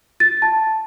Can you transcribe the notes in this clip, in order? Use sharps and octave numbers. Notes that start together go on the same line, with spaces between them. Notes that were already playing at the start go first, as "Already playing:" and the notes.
A6
A5